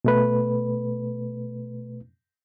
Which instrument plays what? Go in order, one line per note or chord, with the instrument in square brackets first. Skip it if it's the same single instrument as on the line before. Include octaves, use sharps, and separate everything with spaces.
[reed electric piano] B2 A3 B4